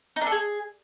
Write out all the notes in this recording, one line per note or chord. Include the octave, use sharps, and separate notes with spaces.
D#4
D4
A4
G#4